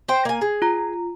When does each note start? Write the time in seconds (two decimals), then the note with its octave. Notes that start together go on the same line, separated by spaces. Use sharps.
0.08 C5 G5
0.25 A#3 G#5
0.41 G#4
0.62 F4 A#5